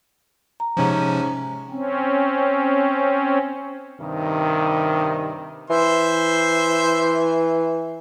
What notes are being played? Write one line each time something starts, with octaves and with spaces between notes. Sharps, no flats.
A#5
G#2 C3 F3 C#4
C4 C#4
G2 C3 D#3
E3 C5 E5 C6